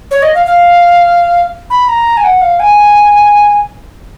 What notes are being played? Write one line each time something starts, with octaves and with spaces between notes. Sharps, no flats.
C#5
D#5
F5
F5
B5
A#5
G#5
F#5
F5
G#5